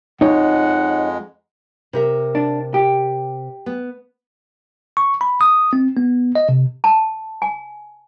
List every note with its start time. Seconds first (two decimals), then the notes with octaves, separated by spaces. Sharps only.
0.21 F2 G#3 D#4 C#5 F#5
1.93 C3 A#4 E5
2.35 D4
2.74 G4
3.66 B3
4.97 C#6
5.21 B5
5.41 D#6
5.73 C4
5.97 B3
6.35 D#5
6.49 C3
6.84 A5
7.42 G#5